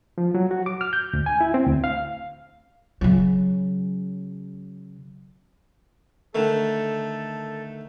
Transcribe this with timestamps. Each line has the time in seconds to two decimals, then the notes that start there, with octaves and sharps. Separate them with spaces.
0.18 F3
0.35 F#3
0.51 F#4
0.66 D6
0.81 F6
0.93 G6
1.13 D2
1.26 G#5
1.41 E4
1.54 C4
1.66 D2
1.84 F5
3.01 C#3 F#3
6.35 D3 D#3 A3 A4